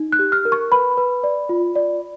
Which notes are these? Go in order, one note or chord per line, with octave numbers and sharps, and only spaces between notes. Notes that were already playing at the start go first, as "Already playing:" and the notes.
Already playing: D#4
F#6
G4
F6
A#4
C#6
B4 B5
B4
D5
F4
D5